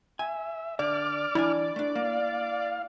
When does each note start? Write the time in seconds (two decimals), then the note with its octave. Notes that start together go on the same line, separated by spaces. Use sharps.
0.19 E5 G#5
0.79 D3 D5 D6 F6
1.35 E3 D4 E4 G#5
1.76 A3 D4
1.95 A#3 F5